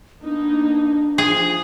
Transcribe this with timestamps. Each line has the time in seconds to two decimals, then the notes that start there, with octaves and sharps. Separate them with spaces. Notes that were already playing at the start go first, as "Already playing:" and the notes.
0.22 A#3 B3 D4 D#4
1.18 F3 G#4